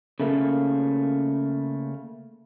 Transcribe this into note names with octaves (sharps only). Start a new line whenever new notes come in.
C#3 A3 A#3